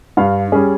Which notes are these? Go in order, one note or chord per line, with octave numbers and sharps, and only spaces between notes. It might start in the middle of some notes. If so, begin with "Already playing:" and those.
G2 F5
G3 C#4 G#4